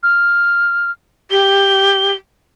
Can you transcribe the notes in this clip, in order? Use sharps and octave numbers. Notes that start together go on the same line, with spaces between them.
F6
G4 G7